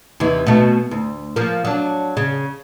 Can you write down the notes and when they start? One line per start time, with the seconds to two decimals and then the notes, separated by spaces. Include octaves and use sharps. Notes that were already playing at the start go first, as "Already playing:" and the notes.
0.20 D#2 C3 E3
0.47 B2 A3
0.91 D2
1.36 F3 A#3
1.65 F#3 D4
2.17 C#3